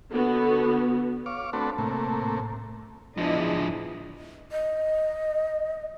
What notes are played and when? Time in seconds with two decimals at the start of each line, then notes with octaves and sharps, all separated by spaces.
0.11 D3 B3 F#4
1.26 C#5 F5 D6
1.53 A3 C4 D4 F#4 A4 B4
1.78 A2 C3 A3 A#3
3.17 E2 F3 G#3 D4 E4 D#5
4.52 D#5